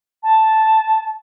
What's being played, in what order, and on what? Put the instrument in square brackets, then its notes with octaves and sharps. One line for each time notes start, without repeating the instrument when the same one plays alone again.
[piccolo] A5